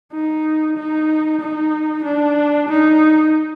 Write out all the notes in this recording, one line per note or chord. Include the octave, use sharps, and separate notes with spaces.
D#4
D#4
D#4
D4
D#4